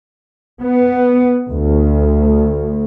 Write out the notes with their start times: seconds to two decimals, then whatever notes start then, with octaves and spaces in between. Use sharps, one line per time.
0.62 B3
1.50 D2